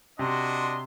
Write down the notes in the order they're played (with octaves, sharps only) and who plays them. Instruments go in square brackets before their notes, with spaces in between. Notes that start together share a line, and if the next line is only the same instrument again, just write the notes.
[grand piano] C3 [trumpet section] D4 F#4 D#5 [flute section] C6